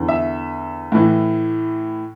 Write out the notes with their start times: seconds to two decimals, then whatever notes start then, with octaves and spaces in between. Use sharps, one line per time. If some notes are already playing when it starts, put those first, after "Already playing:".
Already playing: E2 D3
0.08 E5
0.92 A2 E3